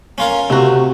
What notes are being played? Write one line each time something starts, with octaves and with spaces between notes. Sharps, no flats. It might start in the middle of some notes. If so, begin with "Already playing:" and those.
C#4 F4 A#4
C3 A3 F#4